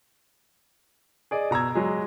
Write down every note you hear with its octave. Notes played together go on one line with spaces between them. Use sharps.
G#4 D5 D#5
B2 A#5 E6 G#6
F#3 G#3